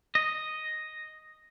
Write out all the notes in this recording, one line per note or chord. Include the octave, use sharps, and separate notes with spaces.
D#5